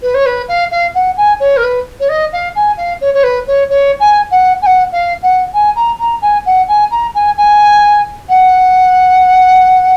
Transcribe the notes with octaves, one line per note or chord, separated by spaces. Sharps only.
B4
C#5
B4
F5
F5
F#5
G#5
C#5
A#4
B4
C#5
D#5
F5
G#5
F5
C#5
C#5
B4
C#5
C#5
G#5
F#5
G#5
F#5
F5
F#5
G#5
A#5
A#5
G#5
F#5
G#5
A#5
G#5
G#5
F#5